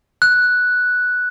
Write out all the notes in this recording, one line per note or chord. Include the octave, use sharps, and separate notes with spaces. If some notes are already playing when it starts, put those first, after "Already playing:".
F#6